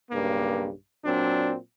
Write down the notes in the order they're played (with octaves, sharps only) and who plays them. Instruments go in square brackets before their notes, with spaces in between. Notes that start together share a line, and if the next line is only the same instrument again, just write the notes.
[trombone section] B1 G2 C#3 A#3
A#2 F#3 C4 D4